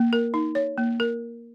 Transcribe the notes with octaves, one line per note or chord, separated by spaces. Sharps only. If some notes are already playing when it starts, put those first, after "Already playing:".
Already playing: A#3
A#4
D#4
C#5
A#3
A#4